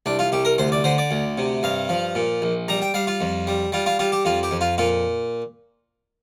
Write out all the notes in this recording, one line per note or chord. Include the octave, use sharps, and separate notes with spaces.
C2 D4
F4
C2 G4
A#4
D2 C5
D5
D3 C5
D5
D2
C3
G2 F5
F3
A#2
A#1
G3 A#5
G5
G3 F5
F4
F2
G3
G3 F4
F4
G3 F4
G4
F2 F4
G4
F2
F4
A#2 F4